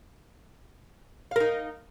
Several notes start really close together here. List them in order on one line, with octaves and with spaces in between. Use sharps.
F5 A#4 D#4